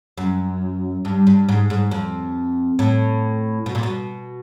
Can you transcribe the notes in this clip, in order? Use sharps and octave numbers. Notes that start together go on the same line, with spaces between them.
F#2
G2
G2
G#2
G#2
F2
A2
B2
A#2
B2